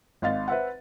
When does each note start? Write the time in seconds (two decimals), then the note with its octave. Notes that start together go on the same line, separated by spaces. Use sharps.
0.22 G#1 D#5 F5 A6
0.48 B4 C5 E5 F#5